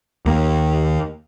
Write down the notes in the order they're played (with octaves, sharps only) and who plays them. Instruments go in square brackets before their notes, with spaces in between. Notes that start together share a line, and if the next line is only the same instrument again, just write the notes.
[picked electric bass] D#2 A#3